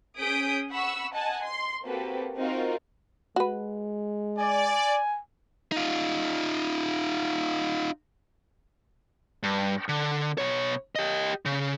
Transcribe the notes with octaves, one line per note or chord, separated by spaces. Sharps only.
C#4 G#4 D#6 G6 B6 D7
F#5 B5 C#6 E6
D#5 F#5 G#5 A5
C6
A#3 C4 F#4 G4 A4 B4
C4 D#4 F4 F#4 A#4
G#3 F#4 B4
D5 G#5
D#4 F4
G2
D3
B2 C#5
G4 D#5
C#3